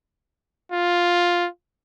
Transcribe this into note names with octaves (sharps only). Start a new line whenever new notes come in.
F4